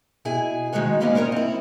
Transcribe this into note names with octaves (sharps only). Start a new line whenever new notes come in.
B2 E4 G#4 G#5
D#3 G#3 D#4 F#4 C#5
A#3 B3 C#4 D5 D#5 F5
F4 A#4 C#5 D#5 A#5
C4 E4